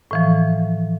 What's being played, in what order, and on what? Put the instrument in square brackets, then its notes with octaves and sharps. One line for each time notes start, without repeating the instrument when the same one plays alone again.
[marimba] A2 E3 F3